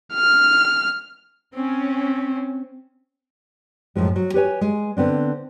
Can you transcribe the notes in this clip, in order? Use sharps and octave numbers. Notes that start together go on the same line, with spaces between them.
F6
C4 C#4
F#2 A2 F3 G#3
F#3
G4 B4 C#5 G#5
G#3
D3 B3 C4 D4